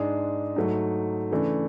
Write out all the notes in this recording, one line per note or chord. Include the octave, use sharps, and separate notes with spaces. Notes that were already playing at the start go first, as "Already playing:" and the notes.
Already playing: G#2 G#3 D4 G#4
G#2 F#3 A3
C#3 E3 A3 D4